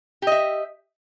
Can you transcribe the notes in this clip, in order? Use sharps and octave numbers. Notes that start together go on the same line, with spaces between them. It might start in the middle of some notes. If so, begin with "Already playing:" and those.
G4 D#5 E5